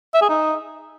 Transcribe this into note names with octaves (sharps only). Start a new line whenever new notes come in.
E5
G#4
D#4